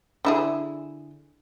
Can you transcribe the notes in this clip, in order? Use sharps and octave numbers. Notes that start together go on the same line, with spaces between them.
D3 E4 G#4